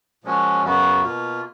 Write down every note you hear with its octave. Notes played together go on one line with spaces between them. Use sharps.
A#2 F3 G#3 C#4 F#4
F#2 C#3 F#3 B3 F#4
B2 A#3 F4